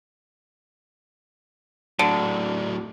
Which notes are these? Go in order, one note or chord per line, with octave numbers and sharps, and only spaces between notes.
A2 D3 F#3